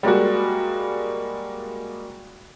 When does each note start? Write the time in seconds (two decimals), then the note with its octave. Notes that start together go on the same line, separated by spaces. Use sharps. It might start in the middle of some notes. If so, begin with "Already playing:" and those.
0.03 G3 G#3 A#3 F#4